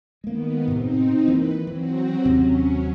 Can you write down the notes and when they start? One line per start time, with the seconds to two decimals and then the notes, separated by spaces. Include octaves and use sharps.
0.24 D#3 G#3 A#3 B3
0.68 A2 C3 C4 D#4
1.28 E3 A#3 B4
1.67 E3 F#3 C4 F#4
2.25 D#2 C3 F#3 C4 C#4